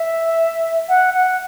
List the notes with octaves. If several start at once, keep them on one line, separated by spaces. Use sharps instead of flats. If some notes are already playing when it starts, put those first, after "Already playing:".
Already playing: E5
F#5
F#5